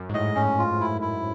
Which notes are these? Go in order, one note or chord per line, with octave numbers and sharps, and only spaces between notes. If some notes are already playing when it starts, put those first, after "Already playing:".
Already playing: F#2
G#2
A2 D#5
G#2 C#4
F4
E4
E4